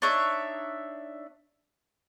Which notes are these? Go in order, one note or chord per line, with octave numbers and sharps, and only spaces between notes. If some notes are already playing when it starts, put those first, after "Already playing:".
D4 D#4 C#5 E5